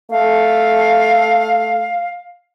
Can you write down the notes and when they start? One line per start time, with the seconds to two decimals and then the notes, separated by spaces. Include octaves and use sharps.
0.11 A3 F5